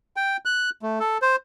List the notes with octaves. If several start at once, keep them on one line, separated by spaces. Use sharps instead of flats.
G5
F#6
A3
A4
C5